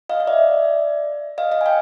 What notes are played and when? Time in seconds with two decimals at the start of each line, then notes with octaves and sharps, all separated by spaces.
0.09 D#5 F5
0.20 F5
0.27 D5 E5
1.38 D#5 F5
1.51 D#5 F5
1.61 G#5
1.66 F5 G5